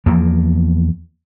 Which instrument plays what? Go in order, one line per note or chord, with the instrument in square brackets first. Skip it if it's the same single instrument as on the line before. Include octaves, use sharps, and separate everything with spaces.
[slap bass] E2 F3 A#3